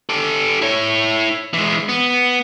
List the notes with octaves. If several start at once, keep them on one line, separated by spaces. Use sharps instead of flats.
G4 A4
E4 C#5
E3 G#3
B3